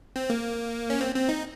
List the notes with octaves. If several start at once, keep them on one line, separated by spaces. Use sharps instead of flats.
C4
A#3
C#4
C4
C4
D#4